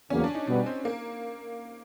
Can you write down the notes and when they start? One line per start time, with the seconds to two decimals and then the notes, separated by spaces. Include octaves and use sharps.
0.10 E2 C#3 F#3 A#3 C#4
0.24 D4
0.35 D#4
0.47 B2 G3 B3 D4
0.66 C4
0.85 A#3